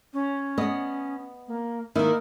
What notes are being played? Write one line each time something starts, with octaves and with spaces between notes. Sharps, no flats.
C#4
B3 D#5
A#3
D#3 A#3 E4